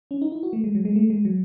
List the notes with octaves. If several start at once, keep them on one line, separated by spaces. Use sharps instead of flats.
C#4
D#4
E4
F#4
A3
G#3
F#3
G#3
A3
G#3
F#3